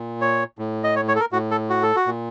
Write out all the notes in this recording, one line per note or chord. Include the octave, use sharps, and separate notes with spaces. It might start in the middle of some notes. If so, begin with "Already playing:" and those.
Already playing: A#2
C#5
A2
D#5
C#5
C#5
A4
A#4
A2 F#4
A4
F#4
A4
F#4
A#2